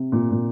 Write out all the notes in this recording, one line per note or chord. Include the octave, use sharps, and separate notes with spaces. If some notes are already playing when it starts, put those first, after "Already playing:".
Already playing: C3
A#2
A#2